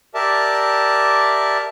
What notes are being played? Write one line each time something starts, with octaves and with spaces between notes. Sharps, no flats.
G4 A#4 D5 E5 A5